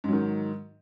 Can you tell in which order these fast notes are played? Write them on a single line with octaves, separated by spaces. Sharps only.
G#2 F#3 D#3